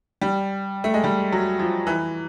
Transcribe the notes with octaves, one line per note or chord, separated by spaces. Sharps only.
G3
A3
G#3
G3
F#3
F3
E3